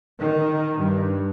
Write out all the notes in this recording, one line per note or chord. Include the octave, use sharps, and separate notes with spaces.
D#3
G2